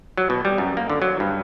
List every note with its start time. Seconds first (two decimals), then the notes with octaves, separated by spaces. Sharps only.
0.17 F#3
0.30 B2
0.45 G3
0.58 F#2
0.77 A#3
0.90 D3
1.02 F#3
1.20 G2